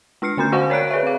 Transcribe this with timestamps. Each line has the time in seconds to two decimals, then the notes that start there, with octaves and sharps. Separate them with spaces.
0.22 G#3 D4 F6 C7 C#7
0.37 D3 A3 C#4 A#5 G6
0.52 F#4 C5 F5 F#5 G#5 C#6
0.70 A#4 C#5 D5 F#6 D7
0.90 G#4 B4 C#5 E5
1.03 C4 F5